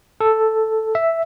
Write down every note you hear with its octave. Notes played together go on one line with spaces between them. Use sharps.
A4
E5